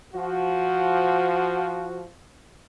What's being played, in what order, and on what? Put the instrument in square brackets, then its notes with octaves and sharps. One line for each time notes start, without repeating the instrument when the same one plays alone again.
[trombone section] F3 F#4